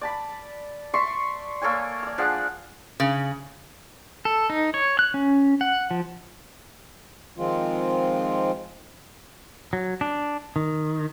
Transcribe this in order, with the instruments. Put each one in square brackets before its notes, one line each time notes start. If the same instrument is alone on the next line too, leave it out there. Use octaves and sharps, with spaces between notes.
[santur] D5 A5 B5
D5 E5 C6 C#6
A#3 A4 C#5 G#5
D5 E6
F3 D4 G#4 F#5
[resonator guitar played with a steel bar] C#3
[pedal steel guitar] A4
D#4
C#5
F#6
C#4
F#5
F3
[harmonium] D#3 F3 G#3 C4 F4
[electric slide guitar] F#3
D4
D#3